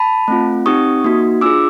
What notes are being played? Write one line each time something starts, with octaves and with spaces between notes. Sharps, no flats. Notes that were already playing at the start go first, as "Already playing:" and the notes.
Already playing: A5 B5
A3 C4 F4
C4 D#4 G4 C#6 D#6
A#3 D#4 F#4
D4 F4 G#4 D6 E6